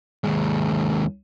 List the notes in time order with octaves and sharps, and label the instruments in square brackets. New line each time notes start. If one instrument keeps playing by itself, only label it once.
[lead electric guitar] D#2 G#3